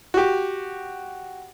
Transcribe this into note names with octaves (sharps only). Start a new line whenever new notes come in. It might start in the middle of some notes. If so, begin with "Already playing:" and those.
F#4 G4